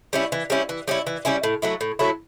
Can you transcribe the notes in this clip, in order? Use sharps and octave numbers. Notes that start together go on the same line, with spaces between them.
G3 C#4 E4
E3
G3 C#4 E4
E3
G3 C#4 E4
E3
G3 C#4 E4
A2
F#3 A3 E4
A2
F#3 A3 E4